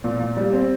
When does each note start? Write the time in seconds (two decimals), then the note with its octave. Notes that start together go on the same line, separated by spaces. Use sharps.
0.04 A#2
0.19 A#2
0.37 G3
0.53 C4